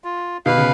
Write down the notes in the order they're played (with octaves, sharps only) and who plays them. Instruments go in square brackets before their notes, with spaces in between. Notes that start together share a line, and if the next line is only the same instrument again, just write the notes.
[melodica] F4
[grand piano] B2 [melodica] B4 F5
[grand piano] C#3